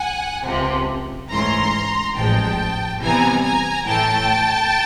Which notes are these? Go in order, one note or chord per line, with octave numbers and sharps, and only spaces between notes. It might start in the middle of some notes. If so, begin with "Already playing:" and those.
Already playing: F#5 G#5
C#2 C3 F3
G#2 E3 A3 C#4 A#5 C6
A1 G#2 F3 G#3 G5 A5
C2 C3 E3 G3 B3 G#5 A#5
G#5 A#5
A2 E3 A3 G5 A5